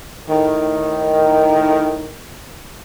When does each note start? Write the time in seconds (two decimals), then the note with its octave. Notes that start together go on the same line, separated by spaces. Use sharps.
0.29 A2 D#3